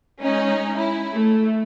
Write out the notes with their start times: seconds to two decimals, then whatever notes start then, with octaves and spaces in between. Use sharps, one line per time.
0.21 G#3 C#4 D#4
0.75 E4
1.14 A3